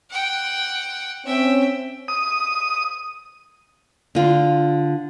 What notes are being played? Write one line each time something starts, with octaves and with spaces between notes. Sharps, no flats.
F#5 G5
C4 C#4 E5 G5
D#6
D3 F4